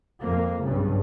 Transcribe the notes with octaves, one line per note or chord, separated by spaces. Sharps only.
F2 A#3
B1 G2 C#3